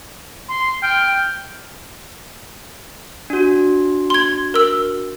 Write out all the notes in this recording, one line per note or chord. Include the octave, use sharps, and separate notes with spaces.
C6
G5 F6
D4 F#4
C6 G#6
A#4 E6